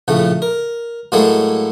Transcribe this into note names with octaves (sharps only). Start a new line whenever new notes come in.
A#1 A2 C#3 A3
A#4
A2 F#3 G#3 A#3 E4 A4